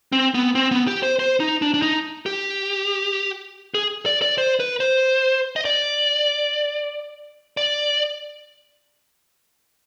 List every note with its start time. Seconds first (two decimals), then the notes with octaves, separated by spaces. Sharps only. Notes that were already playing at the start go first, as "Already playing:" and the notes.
0.12 C4
0.34 B3
0.55 C4
0.71 B3
0.87 G4
1.03 C5
1.19 C5
1.40 D#4
1.62 D4
1.74 D4
1.82 D#4
2.26 G4
3.75 G#4
4.06 D5
4.22 D5
4.38 C5
4.60 B4
4.80 C5
5.56 D#5
5.65 D5
7.57 D5